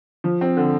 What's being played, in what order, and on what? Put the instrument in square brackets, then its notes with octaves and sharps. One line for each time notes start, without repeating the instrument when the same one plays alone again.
[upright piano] F3
C4
D3